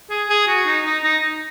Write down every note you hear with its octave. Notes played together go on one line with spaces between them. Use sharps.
G#4
G#4
F#4
D#4
D#4
D#4